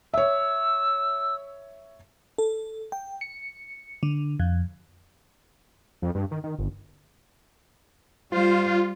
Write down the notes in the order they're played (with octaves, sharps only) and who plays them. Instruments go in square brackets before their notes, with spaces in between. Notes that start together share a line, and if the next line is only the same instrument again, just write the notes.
[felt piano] C#5 E5 [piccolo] E6
[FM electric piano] A4
G5
C#7
D3
F2
[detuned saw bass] F2
G2
D#3
D#3
G1
[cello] G3 C5 [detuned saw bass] F4